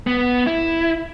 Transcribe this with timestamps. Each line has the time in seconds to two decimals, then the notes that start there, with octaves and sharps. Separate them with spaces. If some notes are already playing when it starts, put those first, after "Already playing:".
0.07 B3
0.47 E4